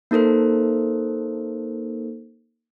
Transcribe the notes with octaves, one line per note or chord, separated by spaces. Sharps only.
A#3 D#4 A4 A#4 C5